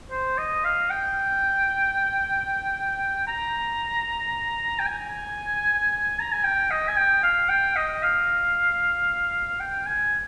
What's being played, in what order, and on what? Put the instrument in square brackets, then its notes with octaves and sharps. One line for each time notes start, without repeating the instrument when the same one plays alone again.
[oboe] C5
D#5
F5
G5
A#5
G5
G#5
A#5
G#5
G5
D#5
G#5
G5
F5
G5
D#5
F5
G5
G#5